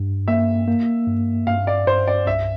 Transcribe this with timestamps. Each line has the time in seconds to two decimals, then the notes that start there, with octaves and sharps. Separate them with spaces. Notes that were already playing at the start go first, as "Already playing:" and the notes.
Already playing: G2
0.28 A#3 E5
0.68 A#3
1.08 G2
1.47 G2 F5
1.67 D5
1.87 G2 C5
2.08 D5
2.26 C2 E5